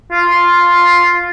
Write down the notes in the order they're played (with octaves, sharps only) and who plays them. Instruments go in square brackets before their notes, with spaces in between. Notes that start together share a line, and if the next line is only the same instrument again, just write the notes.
[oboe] F4